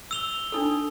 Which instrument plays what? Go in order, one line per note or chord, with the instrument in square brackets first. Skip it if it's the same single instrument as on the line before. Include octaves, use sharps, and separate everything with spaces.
[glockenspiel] E6 F7 G7
[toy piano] D4 D#4 A4